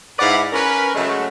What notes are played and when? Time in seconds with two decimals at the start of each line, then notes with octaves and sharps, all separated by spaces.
0.19 G#2 E4 B4 D5 F5 F#5
0.52 C#4 A#4 B4
0.95 C#3 F#3 G#3 A3